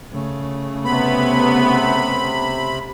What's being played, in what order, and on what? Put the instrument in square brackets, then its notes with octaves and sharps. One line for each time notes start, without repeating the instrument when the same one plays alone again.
[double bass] C#3 A3
[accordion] C3 B5 [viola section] B3